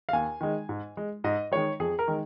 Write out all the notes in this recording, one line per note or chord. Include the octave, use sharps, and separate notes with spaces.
F5
D#2 G#5
D#3 G#3
G#2
G#3
G#2 D#5
D#3 G#3 C#5
F2 G#4
A#4
D#3 G#3